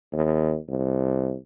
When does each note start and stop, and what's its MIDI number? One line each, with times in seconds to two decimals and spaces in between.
0.13 0.57 39
0.69 1.35 36